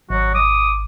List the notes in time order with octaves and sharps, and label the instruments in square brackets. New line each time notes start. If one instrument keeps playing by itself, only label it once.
[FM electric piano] G#1 [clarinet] F#3 [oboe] F#4
[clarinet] D6 [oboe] D#6